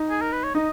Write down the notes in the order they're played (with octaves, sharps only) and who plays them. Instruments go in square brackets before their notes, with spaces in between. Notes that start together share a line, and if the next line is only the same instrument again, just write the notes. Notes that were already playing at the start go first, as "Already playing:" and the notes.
Already playing: [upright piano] D#4
[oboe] G#4
A#4
B4
C#5
[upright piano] D#4 [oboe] D#5